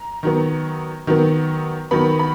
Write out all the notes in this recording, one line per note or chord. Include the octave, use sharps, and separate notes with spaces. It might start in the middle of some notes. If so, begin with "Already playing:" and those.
Already playing: A#5
D#3 F#3 B3
D#3 F#3 B3
D#3 F#3 B3 B5
B5